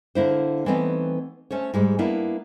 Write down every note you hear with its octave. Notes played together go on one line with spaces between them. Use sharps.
D3 A#3 E4 C5
E3 G3 A3 B3 C4 D#4
A3 C#4 C5 C#5
G#2 G3 G#3
A#3 B3 D4 E4